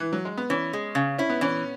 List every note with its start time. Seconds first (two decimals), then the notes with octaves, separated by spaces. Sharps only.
0.00 E3
0.13 F#3
0.25 G#3
0.38 B3
0.50 E3 C#4
0.73 G#3
0.95 C#3
1.18 C#4 E4
1.30 B3
1.41 E3 C#4